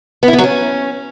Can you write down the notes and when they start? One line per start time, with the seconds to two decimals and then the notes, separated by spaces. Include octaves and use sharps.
0.23 B3
0.28 E4
0.33 B3
0.38 F#3
0.44 C#4